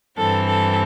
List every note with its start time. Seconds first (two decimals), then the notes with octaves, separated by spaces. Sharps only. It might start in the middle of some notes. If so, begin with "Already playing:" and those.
0.16 G2 E3 C4 A4
0.46 A4